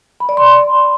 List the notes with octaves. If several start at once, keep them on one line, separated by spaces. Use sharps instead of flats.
B5
D5
C6